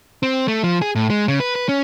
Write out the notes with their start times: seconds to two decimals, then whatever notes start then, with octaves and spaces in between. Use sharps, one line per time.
0.23 C4
0.48 A3
0.63 F3
0.82 G#4
0.95 A2
1.10 G#3
1.28 C#3
1.40 B4
1.55 B4
1.69 C#4